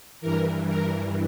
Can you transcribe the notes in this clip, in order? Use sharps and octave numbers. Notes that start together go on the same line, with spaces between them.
G2 E3 A#4
A#4